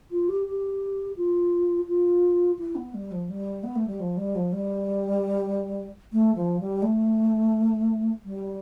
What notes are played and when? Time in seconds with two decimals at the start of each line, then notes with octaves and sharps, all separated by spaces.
0.11 F4
0.29 G4
0.46 G4
1.16 F4
1.88 F4
2.59 E4
2.75 B3
2.94 G3
3.12 F3
3.29 G3
3.64 B3
3.76 A3
3.87 G3
4.00 F3
4.17 G3
4.35 F3
4.52 G3
6.13 A3
6.35 F3
6.60 G3
6.82 A3
8.25 G3